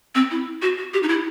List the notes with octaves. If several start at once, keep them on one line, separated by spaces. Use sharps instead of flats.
C4
E4
F#4
F#4
G4
D#4
E4